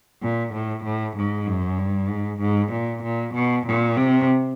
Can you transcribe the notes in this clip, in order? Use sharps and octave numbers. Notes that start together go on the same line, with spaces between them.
A#2
A2
A2
G#2
F#2
G2
G#2
G#2
A#2
A#2
B2
A#2
C3